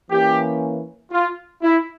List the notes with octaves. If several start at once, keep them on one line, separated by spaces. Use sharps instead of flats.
E3 A#3 C#4 G4
F4
E4